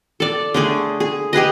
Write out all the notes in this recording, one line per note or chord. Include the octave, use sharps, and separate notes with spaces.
A4 D5
D3 A3 G#4
G#4
G4 G#4 B4 D#5